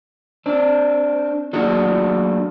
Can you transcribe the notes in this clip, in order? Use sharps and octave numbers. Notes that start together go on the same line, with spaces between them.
C4 D4
F#3 A3 A#3 D4 F#4 G#4